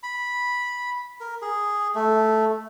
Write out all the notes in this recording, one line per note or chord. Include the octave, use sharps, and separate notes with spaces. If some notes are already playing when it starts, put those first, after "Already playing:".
B5
A#4
G#4
A3